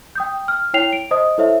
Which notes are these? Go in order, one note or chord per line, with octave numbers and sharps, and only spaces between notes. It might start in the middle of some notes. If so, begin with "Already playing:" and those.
G5 D#6 G6
F6
E4 C#5 G5 C7 F7
D7
C5 D#5 D#6
E4 A4 C5 C#5 E5